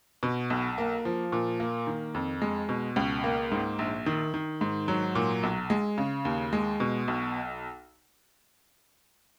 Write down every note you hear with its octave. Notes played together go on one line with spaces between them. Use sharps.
B2
B1
A#3
F3
A#2
A#3
D#3
F2
G#3
B2
C#2
A#3
G#2
A#1
D#3
D#3
G#2
F#3
A#2
B1
G#3
C#3
D#2
G#3
B2
B1